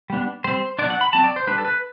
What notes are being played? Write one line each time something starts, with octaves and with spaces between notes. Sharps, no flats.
G3 B3 D4
G3 C4 C5
F#3 B3 D4 D5
F#5
B5
F#3 C4 A5
D5
C5
G3 D4 B4
A4
B4